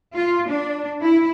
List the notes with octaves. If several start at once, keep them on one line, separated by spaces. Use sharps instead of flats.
F4
D4
E4